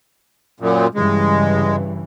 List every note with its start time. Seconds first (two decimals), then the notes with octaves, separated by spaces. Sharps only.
0.60 F#2 A#2
0.95 G2 C#3 E3 G#3